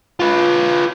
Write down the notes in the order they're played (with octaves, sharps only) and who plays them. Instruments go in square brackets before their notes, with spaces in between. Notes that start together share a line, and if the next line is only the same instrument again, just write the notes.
[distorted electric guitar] F4 B4